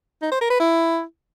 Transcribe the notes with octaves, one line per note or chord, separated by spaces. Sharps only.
D#4
C5
A#4
B4
E4